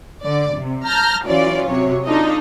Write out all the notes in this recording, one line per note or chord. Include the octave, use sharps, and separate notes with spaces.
D3 D5
C3
A5 A#5 F6 G6 A#6
E3 F#3 C#4 F4 D5
C3 F#3 C#5
D4 D#4 F4 A4 D#5